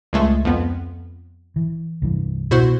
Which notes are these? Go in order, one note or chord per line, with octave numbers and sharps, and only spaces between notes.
C#2 G#3 A3
F2 B3
E3
C2 G2 E3
B2 E4 F#4 C5